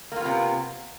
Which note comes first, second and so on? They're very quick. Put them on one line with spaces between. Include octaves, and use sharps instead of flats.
A#3 F4 B3 C3